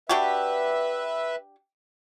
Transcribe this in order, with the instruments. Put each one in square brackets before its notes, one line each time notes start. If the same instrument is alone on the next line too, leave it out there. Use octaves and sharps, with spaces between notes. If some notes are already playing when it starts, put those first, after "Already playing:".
[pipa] D4 F#4 G4 [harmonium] B4 E5